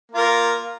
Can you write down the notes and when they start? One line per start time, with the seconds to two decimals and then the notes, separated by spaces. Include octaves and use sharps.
0.12 A#3
0.15 F4
0.18 A#4